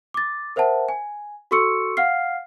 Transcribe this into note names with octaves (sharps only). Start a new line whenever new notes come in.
D6 A6
A#4 C5 E5 F#5 A5
G#5
F#4 A4 C6 C#6 E6 C#7
F5 F#5 F6 C7